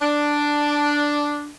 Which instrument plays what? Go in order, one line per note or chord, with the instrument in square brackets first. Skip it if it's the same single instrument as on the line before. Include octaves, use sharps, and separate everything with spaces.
[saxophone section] D4